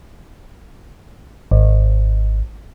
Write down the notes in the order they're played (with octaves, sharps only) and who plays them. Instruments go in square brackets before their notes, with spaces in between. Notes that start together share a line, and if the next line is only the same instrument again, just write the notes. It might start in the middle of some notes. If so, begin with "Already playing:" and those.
[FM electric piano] G#1